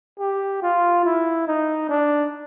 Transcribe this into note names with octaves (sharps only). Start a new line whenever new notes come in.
G4
F4
E4
D#4
D4